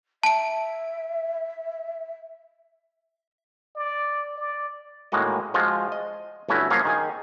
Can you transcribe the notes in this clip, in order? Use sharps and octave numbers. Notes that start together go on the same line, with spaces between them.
E5 A5 D7
D5
D5
A2 D#3 G#3 A#3 F#4 D#5
F3 G#3 F4 F#4
D#5
G1 A3 C#4 E4 F#4
F3 F#3 A#3 C#4 C#5 F5
D#3 G#4 G#5